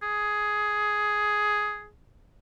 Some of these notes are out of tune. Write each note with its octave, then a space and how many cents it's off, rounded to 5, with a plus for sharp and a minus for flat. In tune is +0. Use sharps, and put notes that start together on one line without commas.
G#4 +10